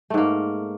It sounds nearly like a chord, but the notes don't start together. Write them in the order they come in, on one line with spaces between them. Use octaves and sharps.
A3 G#2 A#3